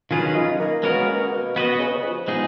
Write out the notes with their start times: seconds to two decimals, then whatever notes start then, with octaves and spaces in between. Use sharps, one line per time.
0.10 D#3 F#3 C#4 F4 G#4 B4
0.35 D#4
0.60 A#3
0.83 G#3 B3 C#4 F#4 A#4
1.07 A#3
1.31 B2
1.55 B2 B3 F#4 B4 D#5
1.79 C#3
1.87 B2
1.96 C#3
2.03 F3
2.28 G#3 B3 D#4 G#4